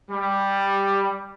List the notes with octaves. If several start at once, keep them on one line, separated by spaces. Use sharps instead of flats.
G3